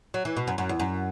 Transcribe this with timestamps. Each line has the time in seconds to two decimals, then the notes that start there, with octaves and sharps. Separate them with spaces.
0.14 F#3
0.25 E3
0.37 B2
0.47 F#2
0.58 F#2
0.69 E2
0.80 F#2